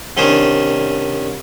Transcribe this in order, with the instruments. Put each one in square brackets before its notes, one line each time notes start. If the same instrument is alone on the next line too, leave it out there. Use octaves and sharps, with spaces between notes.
[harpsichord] C2 D#3 C#4 D4 C5 D#6